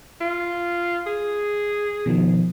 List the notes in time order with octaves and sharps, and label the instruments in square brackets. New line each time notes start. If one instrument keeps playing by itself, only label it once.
[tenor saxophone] F4
G#4
[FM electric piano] B2 D#3 F3